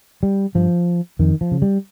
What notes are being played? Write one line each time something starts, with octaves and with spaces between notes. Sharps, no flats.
G3
G2 F3
F2 D#3
F3
C#3
G3